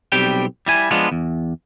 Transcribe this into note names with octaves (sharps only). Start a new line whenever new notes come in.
B1 G3 C4 G4 G5
G3 E4 G#5
F3 G#3 B3 D4 F4
E2